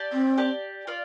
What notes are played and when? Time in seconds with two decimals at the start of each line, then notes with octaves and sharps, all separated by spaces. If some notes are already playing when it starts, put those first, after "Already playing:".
Already playing: G4 D5 A5
0.13 C4
0.38 G4 D5 A5
0.87 F4 D5